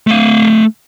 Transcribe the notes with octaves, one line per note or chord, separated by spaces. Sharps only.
A3 F5